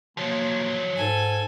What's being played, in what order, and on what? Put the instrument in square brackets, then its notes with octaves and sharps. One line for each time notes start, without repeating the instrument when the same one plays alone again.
[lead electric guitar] F3 F#3 [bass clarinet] A#3
[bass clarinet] G#2 [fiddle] A4 G#5